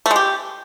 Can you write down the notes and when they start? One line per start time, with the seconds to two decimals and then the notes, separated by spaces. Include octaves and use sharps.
0.06 A3
0.11 G#3
0.16 G4